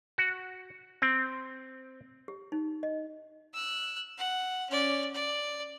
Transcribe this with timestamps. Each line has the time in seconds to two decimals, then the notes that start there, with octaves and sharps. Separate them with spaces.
0.18 F#4
1.02 C4
2.28 G4
2.52 D#4
2.83 D#5
3.54 E6 F#6
4.18 F#5
4.70 C#4 D5
5.14 D5